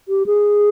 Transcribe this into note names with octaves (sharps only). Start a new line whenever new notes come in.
G4
G#4